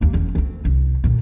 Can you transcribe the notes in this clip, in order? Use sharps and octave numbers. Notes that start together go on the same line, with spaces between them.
D#2 A#3
F#1 E2
D2 C4
C2
D2 A#2